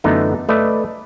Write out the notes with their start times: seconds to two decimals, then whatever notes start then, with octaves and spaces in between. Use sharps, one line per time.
0.04 F#2 D3 E3 A3 B3 D#4
0.49 A3 B4 D5 D#5